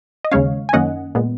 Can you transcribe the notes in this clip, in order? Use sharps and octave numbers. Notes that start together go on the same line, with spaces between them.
D#5
D#2 C#3 G#3 C#4 C#5 F5
G#5
F#2 D#3 A#3 C#4 D#5 F#5
A#2 G#3 B3